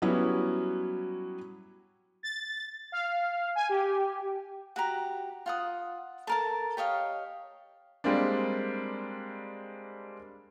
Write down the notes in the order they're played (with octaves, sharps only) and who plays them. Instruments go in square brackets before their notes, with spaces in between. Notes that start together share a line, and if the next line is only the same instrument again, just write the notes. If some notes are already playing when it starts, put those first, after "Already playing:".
[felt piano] F#3 G3 B3 C#4 E4 F#4
[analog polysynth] A6
F5
G#5
G4
[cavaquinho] F#4 G4 A#5
F4 F#5 D#6
A4 A#4 A5
G4 C#5 D#5 F5
[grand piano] G3 G#3 A#3 C4 D4